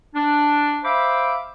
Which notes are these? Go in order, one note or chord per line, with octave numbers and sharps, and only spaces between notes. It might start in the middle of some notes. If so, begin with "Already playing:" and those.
D4
C5 E5 F5 B5 D6